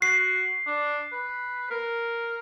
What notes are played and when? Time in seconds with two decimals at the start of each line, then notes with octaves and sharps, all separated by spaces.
0.02 F#4 C7
0.67 D4
1.13 B4
1.71 A#4